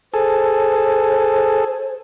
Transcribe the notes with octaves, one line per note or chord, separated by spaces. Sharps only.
G#4 A4 C5